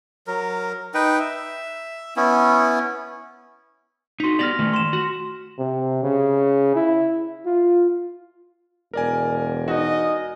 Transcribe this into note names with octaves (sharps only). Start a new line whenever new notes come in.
F#3 A#4
D#4 B4 G5
E5
B3 C#4 E4
D#4 F#4 C6 B6
B3 G4 D5 F6 A#6 F7
D#3 E3 A3
C6 E7
F#4 A#6
C3
C#3
E4
F4
E1 A#4 D5 G#5
D#4 F#4 D#5